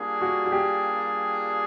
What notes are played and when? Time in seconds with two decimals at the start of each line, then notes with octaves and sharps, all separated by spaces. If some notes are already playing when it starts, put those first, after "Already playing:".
Already playing: G3 A#3 D4 F4 G#4
0.21 F#4
0.45 F#4
0.52 G4